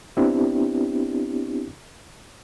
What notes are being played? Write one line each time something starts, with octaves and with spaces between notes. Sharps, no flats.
B3 C4 D4 E4 G4